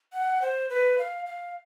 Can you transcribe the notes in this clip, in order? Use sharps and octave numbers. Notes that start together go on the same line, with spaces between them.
F#5
C5
B4
F5
F5